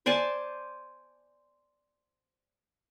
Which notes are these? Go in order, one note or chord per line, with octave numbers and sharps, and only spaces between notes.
C5 D5 G#5 A5